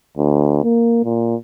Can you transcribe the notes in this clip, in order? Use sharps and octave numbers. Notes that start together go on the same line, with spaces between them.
D2
A#3
A#2